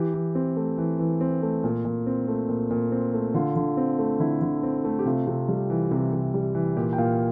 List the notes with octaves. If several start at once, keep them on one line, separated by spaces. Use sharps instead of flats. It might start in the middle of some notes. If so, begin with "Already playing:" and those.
Already playing: E3 G4
E3
C4
A3
E3
E3
C4
A3
A#2
A#2
C4
A3
A#2
A#2
C4
A3
D3 F4
D3
C4
A3
D3 E4
D3
C4
A3
G4
C3 F4
C3
G3
E3
C3
C3
G3
E3
A#2 G4
G5
A#2 F5